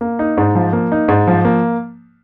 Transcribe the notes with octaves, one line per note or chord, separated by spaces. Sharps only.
A#3
D#4
G#2
F3
A#3
D#4
G#2
F3
A#3